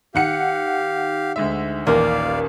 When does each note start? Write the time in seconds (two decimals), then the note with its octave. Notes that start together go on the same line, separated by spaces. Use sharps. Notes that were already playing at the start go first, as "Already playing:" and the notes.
0.15 D#3 G4 F5 F#5 C#7
1.36 D2 G#3 E5
1.87 A1 D#2 A#2 A#3 D5 F5